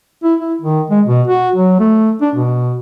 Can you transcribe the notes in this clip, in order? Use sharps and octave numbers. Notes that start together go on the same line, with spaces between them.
E4
E4
D#3
G#3
B2
F#4
F#3
A3
D4
B2